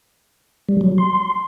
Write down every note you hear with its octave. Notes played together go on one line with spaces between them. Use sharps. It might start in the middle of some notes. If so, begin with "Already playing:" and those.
G3
F#3
C6